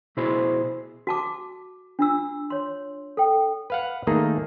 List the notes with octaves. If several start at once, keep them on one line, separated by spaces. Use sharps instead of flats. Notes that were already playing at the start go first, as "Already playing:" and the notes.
B2 E4 F#4 G#4 C5 B5
F#4 A5 D6
D4 F4 E6
C#5 C6
A4 G5
B4 F5 F#5
D#3 A3 A#3 D#4 G#4